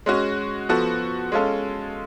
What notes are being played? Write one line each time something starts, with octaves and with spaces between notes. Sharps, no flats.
G#3 C#4 F#4
F3 B3 F#4 A4
G#3 C#4 F4 A4